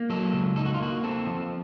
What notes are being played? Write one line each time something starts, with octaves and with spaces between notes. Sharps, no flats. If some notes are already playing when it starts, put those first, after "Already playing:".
Already playing: A#3
F#3 A4
C#2
D#4 A4
F#4
F4
A#3 F#4
C4 A4
F3